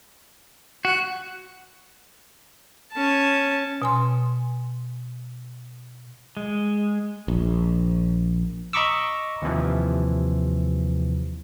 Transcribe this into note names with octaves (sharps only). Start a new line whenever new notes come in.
F#4 F#6
C#4 A5
B2 G#5 C6
G#3
A#1
D#5 A#5 B5 C#6 D6 E6
D#2 C3 E3 F3